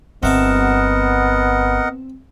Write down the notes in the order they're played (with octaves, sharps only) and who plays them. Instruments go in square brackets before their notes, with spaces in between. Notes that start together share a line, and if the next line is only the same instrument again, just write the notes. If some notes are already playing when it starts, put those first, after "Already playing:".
[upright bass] G1 [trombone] B3 [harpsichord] C4 E5 A5 [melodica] A#4 D#5 F#5